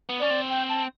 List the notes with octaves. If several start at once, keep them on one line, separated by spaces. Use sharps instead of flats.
B3
C#4 D5
C4
G5
A5